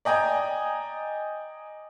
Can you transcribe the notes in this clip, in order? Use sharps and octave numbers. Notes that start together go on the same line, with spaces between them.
D5 D#5 G5 G#5 A#5